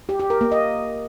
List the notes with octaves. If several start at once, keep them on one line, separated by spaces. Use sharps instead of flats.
G4
G4
A#4
A#3
D#5